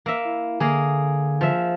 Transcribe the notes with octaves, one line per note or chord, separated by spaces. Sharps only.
A#3 E5 E6
E4
D3 A#3 G#4
F3 E5